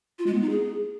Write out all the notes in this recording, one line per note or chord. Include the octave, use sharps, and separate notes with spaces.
F4
G#3
B3
D#4
G#4